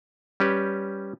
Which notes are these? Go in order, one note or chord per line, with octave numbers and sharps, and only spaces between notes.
G3 C#4 G4 B4